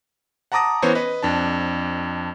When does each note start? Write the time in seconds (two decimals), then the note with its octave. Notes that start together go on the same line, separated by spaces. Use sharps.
0.52 F#5 A5 A#5 D6 D#6 A#6
0.82 E3 B3 C#4 C5 C#5
0.95 B4 D#5
1.23 F2 D4 A5